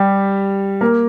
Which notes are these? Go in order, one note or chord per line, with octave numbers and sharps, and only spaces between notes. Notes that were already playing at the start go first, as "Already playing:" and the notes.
Already playing: G3 G4
A#3 A#4